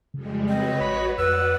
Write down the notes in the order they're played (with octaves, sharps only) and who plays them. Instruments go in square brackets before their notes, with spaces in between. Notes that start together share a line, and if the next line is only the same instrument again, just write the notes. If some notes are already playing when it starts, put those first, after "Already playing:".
[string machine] F2 G3 G#3 [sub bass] C#3
[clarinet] C4 [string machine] F#4 B4 C#5 [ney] D#5
[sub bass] A1 [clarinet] B5
[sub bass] F2 [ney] B4 [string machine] D5 F#5 [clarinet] E6